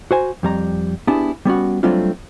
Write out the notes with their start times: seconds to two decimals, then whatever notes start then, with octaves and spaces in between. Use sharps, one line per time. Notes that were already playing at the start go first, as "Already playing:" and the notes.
0.11 F#4 C5 G#5
0.43 F2 G3 A#5
1.07 B3 D4 E4 G4 G#4
1.45 G3 B3 C#4 F#4
1.83 F#3 G3 A3 C4 D4 F4